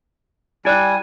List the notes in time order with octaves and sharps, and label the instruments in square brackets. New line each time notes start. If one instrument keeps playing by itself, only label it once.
[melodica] G3 G#5 [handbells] E4 D5 F#6